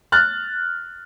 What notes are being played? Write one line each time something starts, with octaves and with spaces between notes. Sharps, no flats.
F6 F#6 A6